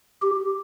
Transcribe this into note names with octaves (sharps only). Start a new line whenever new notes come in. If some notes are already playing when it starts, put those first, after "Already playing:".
G4